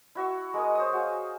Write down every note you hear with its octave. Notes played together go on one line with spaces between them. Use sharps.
E4 F#4 E5 C#6
G#3 A#4 G#5 D#6
C5 C#5 D#6
F#4 G#4 F5